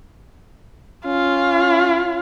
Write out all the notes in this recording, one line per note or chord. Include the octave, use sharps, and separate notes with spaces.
C#4 F4